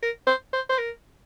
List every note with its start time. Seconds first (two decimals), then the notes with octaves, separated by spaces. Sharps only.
0.02 A#4
0.27 C5
0.53 C5
0.69 C5
0.78 A#4